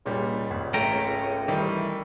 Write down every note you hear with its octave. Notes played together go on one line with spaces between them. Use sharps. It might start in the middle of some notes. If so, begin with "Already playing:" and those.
C#2 A#2 G3
G#1
A3 C#4 G5 A#5
D#3 E3 G3